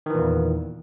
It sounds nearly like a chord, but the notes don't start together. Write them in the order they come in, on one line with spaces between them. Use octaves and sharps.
D#3 E3 A#2 E2